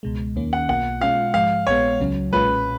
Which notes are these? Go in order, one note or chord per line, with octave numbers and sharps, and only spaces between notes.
C#2 B2 G#3
D#2 D#3 A#3 C#4
F#5
B1 B2 A#3 F4 F#5
B2 G#3 C#4 F4 F5
G#2 F3 G#3 F5
A#1 A#2 G#3 B3 C#5
C#2 C#3 F#3 C#4
B1 A#2 G#3 C#4 F4 B4